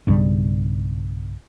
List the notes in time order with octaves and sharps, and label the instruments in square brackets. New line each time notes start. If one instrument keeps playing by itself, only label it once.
[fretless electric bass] B1 G2 C#3 G3